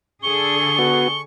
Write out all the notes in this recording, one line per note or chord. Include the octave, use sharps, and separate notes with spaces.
D3 G#4 A4 C#6 G7
B3 F#4